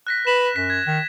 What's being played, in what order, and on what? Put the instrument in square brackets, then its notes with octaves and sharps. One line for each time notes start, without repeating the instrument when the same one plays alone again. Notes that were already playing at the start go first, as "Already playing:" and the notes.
[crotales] F#6 A#6 B6
[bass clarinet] B4 [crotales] E7
[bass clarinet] F#2 [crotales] B6
[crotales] G#6
[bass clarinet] D#3